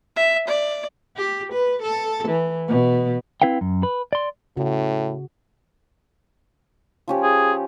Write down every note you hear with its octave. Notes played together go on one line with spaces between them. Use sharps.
E5
D5
G4
B4
A4
E3
B2
C4 E4 B4 F5 G5
F#2
B4
D5 C6
A2 C#3 F#4
F3 C#4 G4
G#4